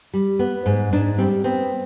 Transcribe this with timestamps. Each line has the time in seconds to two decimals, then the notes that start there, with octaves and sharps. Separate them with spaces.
0.14 G3
0.39 B3
0.66 G#2
0.93 G#2 D4
1.18 G3 C4
1.44 B3 C4